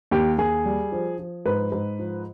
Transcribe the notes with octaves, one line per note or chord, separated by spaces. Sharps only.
D#2 G4
D#2 G#4
G3
F3
F3
G#2 B4
G#2
F3